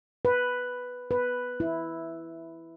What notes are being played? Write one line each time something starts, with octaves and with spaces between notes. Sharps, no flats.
B4
B4
E4